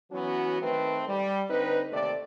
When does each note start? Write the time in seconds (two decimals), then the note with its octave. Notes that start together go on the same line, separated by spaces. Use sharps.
0.11 E3 F#3 B3 C#4 F#4
0.60 D#3 A3 C4 B4
1.07 G3
1.49 D3 C4 D#4 B4
1.91 D#2 C3 A3 D5